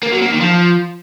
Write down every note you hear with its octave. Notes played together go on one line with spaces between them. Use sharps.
A#3
F#3
A#3
D#3
F3